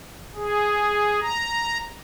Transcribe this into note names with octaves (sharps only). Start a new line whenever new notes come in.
G#4
A#5